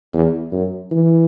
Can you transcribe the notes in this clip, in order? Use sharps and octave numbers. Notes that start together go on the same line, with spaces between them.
E2
F#2
E3